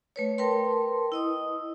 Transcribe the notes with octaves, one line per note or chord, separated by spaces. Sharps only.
A3 B4 C#5
A#4 B4 G5 A5 C6
E4 D#5 D#6